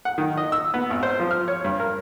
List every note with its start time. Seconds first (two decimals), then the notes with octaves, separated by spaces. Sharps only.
0.05 F#5
0.18 D#3
0.38 D#5
0.52 E6
0.74 B3
0.90 G#1
1.03 C5
1.20 F3
1.31 F6
1.48 C#5
1.64 G2
1.80 A#4